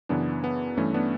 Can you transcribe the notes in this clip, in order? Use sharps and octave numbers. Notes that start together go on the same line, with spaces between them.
F#2 C#3 E3 B3 D4
B3
G2 E3 A3 C#4
B3 D4